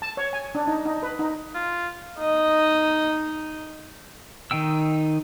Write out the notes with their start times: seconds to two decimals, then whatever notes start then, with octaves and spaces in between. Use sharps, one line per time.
0.02 A5
0.17 C#5
0.33 G#5
0.55 D4
0.67 D#4
0.85 D#4
1.03 B4
1.19 D#4
1.55 F4
2.18 D#4 D#5
4.51 D#3 D#4 G5 E6